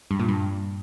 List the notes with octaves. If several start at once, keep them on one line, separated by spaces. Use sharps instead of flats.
G2
A#2
G2